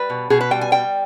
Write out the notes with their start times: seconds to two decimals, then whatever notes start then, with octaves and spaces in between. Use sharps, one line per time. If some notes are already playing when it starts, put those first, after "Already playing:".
Already playing: G3 B4
0.10 B2
0.30 B2 G#4
0.41 B4
0.51 G3 G5
0.61 G#5
0.72 G3 G5